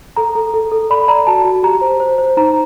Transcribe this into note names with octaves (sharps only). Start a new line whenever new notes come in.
A4 A#5
A4
A4
A4
D5 B5
D5 A#5
F#4 A5
F#4
G4 A#5
C5
C5
C5
D#4 A#5